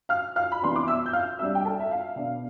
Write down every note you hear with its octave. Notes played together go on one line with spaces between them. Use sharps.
F5 F6
F5 F6
B5
C3 E3 B3 D4 C6
D6
E5 E6
G6
F5 F6
C3 G3 D4 E5 E6
G5
A4 A5
E5
F5
B2 B3 D4